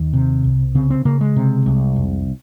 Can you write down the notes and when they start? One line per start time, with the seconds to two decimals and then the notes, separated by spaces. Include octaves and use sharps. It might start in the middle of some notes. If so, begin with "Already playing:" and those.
Already playing: D#2
0.13 C3
0.44 C2
0.75 C#3 C4
0.90 C4
1.05 C#3 A#3
1.21 G#3
1.36 C3
1.66 C2
1.96 F1